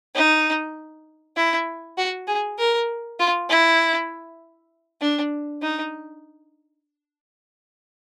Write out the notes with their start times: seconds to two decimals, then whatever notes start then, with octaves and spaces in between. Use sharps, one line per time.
0.15 D#4
1.37 E4
1.98 F#4
2.28 G#4
2.58 A#4
3.19 F4
3.50 E4
5.02 D4
5.62 D#4